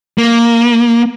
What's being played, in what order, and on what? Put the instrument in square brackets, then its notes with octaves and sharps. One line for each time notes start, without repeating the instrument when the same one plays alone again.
[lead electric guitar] A#3